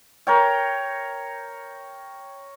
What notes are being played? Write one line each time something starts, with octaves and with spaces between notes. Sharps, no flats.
A#4 C#5 G5